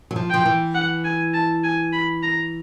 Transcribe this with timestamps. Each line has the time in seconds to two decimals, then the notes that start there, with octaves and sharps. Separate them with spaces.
0.11 F#3
0.16 F3
0.30 F3 G5
0.46 E3
0.75 F#5
1.05 G#5
1.34 A5
1.64 G#5
1.93 B5
2.23 A#5